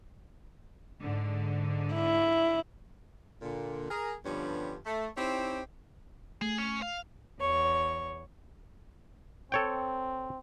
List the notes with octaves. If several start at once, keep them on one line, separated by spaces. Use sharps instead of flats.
G#2 D3
E4
A#2 D3
G#4 A#4
G2 D3 F3 G3 B3 C#4
A3
C4 D#4 E4 G4 C5 C#5
A3 G#4
C#4 C#5
F5
E2 C#5 C#6
C4 A4 C#5 G5